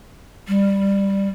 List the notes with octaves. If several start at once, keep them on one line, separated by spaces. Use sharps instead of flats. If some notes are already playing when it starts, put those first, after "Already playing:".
G3